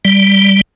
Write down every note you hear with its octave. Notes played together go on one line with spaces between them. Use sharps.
G3